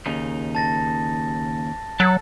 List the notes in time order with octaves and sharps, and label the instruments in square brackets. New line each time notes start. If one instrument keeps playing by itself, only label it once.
[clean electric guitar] D#2 C#3 D#4
[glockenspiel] A5 A6 A#6
[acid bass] F#3 [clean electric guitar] A4 F#5 A5